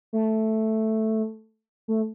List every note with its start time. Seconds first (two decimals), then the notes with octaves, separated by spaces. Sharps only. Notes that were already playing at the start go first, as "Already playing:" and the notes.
0.13 A3
1.88 A3